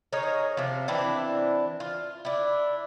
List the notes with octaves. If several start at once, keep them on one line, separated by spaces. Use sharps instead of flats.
D#4 G#4 A#4 C#5
C3 F3
E3 C4 D4 E4
F4
D4 E4